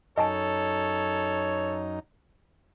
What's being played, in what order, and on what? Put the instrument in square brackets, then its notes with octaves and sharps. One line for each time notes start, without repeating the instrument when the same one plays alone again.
[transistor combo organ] F#2 D#4 [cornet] A4 [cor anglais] C#5 [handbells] D#5 G#5 A5